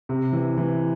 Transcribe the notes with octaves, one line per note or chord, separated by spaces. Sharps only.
C3
E3
E3